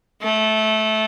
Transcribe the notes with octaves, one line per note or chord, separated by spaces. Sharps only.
A3